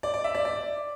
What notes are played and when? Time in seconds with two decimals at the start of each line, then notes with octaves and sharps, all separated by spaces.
0.03 D5
0.14 D5
0.24 E5
0.35 D5
0.45 D5